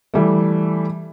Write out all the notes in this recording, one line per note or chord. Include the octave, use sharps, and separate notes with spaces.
E3 G3 A3